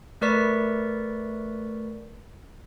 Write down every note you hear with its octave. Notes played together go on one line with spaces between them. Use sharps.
A3 A#4 B4 D5 C#6 B6